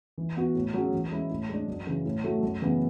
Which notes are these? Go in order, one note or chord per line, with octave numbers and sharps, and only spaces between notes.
E3
B3 F#4
A2
F#3 C#4 G#4
E3
G#3 C#4 E4
A2
G#3 D4
F#2
C#3 E3
A2
F#3 A3 E4 A4
F#2
C#3 E3 B3